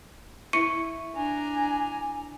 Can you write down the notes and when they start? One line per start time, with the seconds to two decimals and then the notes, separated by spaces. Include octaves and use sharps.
0.53 E4 C#6 C#7 D#7
1.15 D4 G#5 A#5